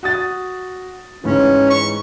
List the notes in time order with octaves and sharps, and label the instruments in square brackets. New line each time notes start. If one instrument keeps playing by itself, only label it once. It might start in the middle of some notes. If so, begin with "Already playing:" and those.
[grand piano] F#4 D#6 A6
[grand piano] G#2 E3 [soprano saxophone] C#4
[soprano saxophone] C#6